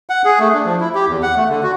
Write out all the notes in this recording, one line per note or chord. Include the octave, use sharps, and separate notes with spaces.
F#5
G#4
A3
D4
F3
E4
G4
E2
F#5
A3
D3
F#4